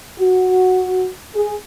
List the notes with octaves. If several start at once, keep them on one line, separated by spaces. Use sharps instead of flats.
F#4
G#4